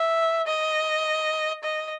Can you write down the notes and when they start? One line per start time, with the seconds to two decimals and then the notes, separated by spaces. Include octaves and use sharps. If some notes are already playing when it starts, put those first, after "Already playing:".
Already playing: E5
0.47 D#5
1.64 D#5